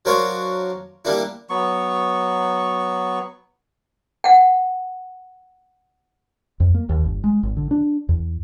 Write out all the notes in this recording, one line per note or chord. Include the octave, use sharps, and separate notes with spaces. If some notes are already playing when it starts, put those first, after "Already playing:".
F#3 D4 A#4 C5 C#5 F5
G3 A#3 D4 E4
F#3 B3 C#6
F#5 G5
F2
A#3
D#2
G1
G#3
G#1
D3
D4
E2